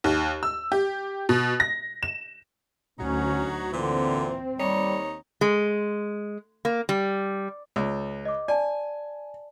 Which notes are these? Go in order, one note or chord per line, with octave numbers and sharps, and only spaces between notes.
D#2
E6
G4
B2
A#6
E7
D2 F#3 C#4 D#4 F#4
A#2 D3 E3 C4
D#2 G3 D#4 C#5
G#3
A#3
G3
C#2
D#5 D6
D5 G#5 A5